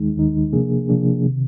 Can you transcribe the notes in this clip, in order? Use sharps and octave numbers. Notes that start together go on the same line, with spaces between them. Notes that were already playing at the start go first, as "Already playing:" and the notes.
Already playing: D#2 D#3 G#3 D#4
D#2 D#3 G#3 D#4
C3 F3 A#3 D4 G#4
C3 F3 A#3 D4 G#4
C3 D#3